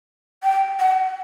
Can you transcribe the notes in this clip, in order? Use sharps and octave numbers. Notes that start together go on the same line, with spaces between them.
G5
F#5